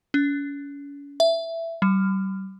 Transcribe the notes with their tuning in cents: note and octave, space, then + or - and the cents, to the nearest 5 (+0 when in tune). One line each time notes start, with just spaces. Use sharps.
C#4 +40
E5 +10
G3 -35